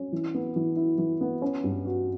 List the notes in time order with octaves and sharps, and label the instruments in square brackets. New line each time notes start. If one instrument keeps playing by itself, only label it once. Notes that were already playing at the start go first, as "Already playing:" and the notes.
Already playing: [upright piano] C#4
E3
B3
E3
E4
E3
B3
C#4
G2
F#4